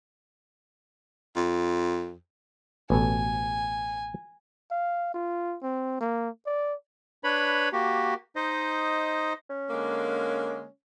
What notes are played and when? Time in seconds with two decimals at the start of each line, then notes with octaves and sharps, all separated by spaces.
1.36 F2
2.90 A1 B2 A4 G#5
4.71 F5
5.14 F4
5.63 C4
6.01 A#3
6.46 D5
7.24 D4 B4 C#5 B5
7.73 A#3 F#4 G4
8.36 D#4 C5 D#5
9.50 C#4
9.68 D3 G#3 A#3